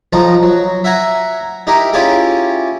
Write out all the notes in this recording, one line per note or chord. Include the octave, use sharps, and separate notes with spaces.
B1 F3 D#4 A#5
F#3
E5 F#5 G#5 A#5
D#4 E4 G4 A#4
C#4 E4 F4 G4 G#4 F5